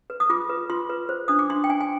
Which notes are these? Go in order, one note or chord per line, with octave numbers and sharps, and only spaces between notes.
B4
D#6
F4 D6
B4
F4 C6
B4
C5
D4 D#6
D6
D4 C6
G5
D4 G#5
G#5